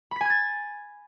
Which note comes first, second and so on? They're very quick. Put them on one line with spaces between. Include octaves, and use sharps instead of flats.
B5 B6 G#5 G#6 A6